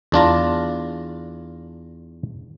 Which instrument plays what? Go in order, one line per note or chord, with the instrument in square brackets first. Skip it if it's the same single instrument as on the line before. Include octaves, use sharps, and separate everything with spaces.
[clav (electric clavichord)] E2 D4 F4 A#5